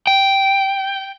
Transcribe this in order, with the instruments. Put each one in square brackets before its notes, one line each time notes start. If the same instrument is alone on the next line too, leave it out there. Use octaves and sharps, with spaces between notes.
[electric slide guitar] G5